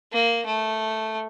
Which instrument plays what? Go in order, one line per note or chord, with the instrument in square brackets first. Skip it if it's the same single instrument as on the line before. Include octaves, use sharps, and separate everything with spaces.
[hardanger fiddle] A#3
A3